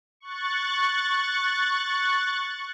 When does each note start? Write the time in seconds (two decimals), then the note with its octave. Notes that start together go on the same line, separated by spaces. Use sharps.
0.20 C#6 F#6 A6